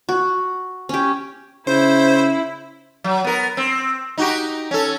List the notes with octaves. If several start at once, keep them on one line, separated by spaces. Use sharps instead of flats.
F#4
C#4 G4
C#3 E4 C5
F#3
B3 A#4
C4
D#4 F#4 G4
C#4 A4